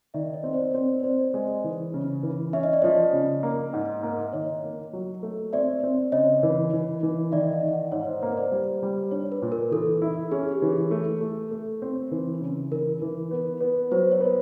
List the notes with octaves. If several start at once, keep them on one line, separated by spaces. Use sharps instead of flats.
D#3 D5 E5
C#5 D#5
C4
C5 D5
C4 C#5
C4 C5 D5
G#3
E3
C#3
E3
C#4 E5
D#5
D5
F3 C#5 D#5
C#3
A#3
G#2
A#3
E5
D#3 C#5 D#5
A#3
F#3
A3
C4 D5 E5
C4
C#3 C#5 D#5
E3
E3
E3
D#3 D5 E5
D#5 F5
D#3
E5 F#5
G#2 C#5
C5
A#3 B4
C5 D5
G3
G3
D4 C#5
B4
A#2
A#4
E3 A4
E4
C#4 G#4
G4
E3
G#4
A3 A4
A3
A3
C4
E3
C#3
E3 A#4
E3
B3
B3
F#3 C5
C#5
B3